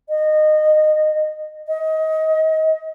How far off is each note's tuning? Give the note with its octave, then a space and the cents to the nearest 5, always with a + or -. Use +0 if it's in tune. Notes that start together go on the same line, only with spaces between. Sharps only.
D#5 -20
D#5 +25